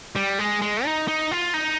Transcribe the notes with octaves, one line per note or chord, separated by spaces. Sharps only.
G3
G#3
G#3
D#4
D#4
F4
D#4